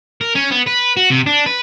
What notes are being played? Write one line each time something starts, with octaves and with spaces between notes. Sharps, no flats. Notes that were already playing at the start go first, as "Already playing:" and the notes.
A#4
C#4
B3
B4
F#4
C3
D4
B4